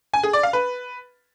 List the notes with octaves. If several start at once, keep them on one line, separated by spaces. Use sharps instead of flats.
G#5
G#4
D5
F5
B4